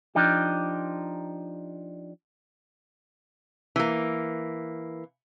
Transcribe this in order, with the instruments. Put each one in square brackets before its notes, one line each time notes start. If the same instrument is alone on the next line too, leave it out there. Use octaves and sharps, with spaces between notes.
[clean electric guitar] F3 D4 D#4 G4
[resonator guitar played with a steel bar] E3 A#3